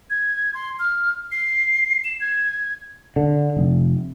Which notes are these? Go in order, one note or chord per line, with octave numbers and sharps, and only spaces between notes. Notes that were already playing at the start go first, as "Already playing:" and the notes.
G#6
C6
F6
C7
E7
G#6
D3
F1